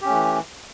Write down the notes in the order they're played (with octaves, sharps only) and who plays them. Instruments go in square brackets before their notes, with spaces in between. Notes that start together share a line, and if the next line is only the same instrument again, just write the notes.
[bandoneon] G4
C#4
A3
E3